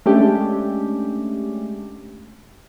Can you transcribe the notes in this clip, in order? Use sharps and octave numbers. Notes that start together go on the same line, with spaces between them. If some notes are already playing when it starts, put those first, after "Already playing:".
G#3 A3 C#4 D4 G4